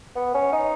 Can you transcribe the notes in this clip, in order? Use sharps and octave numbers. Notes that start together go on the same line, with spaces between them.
B3
C#4
D#4